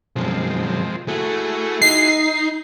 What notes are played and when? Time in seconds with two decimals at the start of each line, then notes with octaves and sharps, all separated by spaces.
0.16 B1 F#2 F3 G#3 C4
1.08 A3 E4 F#4 G#4
1.82 D#4 C7